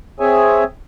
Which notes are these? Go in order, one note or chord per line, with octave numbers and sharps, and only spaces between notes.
C4 G#4 C#5 E5 G#5